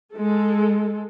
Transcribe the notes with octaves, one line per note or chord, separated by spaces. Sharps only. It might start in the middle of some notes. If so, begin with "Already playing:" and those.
G#3 A4